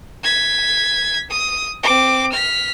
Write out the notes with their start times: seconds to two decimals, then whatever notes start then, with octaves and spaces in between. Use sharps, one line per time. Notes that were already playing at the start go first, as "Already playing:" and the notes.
0.23 G#6 B6
1.30 D#6
1.83 C4 D6
2.32 F6 B6